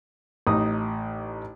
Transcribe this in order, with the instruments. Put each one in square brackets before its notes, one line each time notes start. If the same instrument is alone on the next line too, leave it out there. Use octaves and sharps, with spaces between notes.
[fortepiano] A1 D#4 D#6